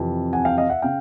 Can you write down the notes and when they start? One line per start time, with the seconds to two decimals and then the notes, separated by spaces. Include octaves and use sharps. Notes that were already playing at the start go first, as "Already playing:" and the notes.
Already playing: F2 C3 E3
0.33 F#5 G#5
0.45 F5 G5
0.58 D#5 F5
0.69 E5 F#5
0.82 C#3 F5 G5